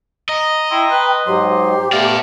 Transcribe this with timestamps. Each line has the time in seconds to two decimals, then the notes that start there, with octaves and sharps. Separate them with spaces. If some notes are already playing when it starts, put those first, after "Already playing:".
0.29 D#5 A#5
0.71 E4 G5 A#5 C6
0.91 B4
1.27 G#2 F#3 G4 C6
1.92 A3 B3 D5 F5